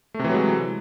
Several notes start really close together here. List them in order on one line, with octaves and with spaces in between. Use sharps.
A3 C3 E3 F#3 G#3